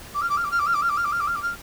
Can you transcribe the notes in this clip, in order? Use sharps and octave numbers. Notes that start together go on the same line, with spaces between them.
D6
F6
D6
F6
D6
F6
D6
F6
D6
F6
D6
F6
D6
F6
D6
F6
D6
F6